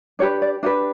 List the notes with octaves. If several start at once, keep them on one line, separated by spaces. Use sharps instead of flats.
D4 G4 B4 C#5
D5
D4 G4 B4 D#5